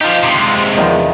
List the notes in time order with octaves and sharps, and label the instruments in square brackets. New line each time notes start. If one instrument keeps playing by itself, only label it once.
[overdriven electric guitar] F3 G4 [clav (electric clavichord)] D#4 F4
[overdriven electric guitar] C3 G#3
[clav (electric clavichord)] E2 D#3 F3